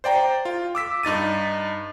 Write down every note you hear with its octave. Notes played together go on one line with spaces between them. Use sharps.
C5 D5 G5 A#5
F4
D6 E6 B6
G2 D#4 A6 D#7